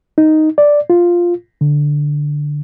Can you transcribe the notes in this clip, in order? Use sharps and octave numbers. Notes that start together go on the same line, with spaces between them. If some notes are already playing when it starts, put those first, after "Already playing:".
D#4
D5
F4
D3